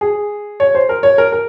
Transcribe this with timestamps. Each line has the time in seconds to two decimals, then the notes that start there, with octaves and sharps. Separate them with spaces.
0.01 G#4
0.60 C#5
0.75 C5
0.89 A#4
1.03 C#5
1.18 A#4
1.32 A#4